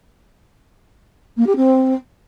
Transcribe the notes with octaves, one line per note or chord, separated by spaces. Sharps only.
A#3
G4
C4